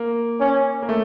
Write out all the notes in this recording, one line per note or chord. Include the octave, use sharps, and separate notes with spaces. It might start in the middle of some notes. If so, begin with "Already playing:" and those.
Already playing: A#3
C#4
A#3
A3